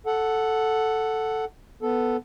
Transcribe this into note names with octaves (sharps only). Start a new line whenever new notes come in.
A4 F#5
B3 A4